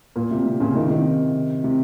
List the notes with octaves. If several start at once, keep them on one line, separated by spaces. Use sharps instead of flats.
A#2
C3
C3
A#2 C#3
C3 D#3
C3 D#3
C3